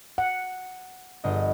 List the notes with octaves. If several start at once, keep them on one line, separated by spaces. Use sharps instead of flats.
F#5
G1 D#5